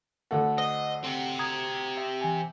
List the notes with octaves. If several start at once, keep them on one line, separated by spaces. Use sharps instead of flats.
D2 A3 F#5 A5
C5 D#5 F#5
C4 G4
A#5 D#6 G#6
E5
E3 G#5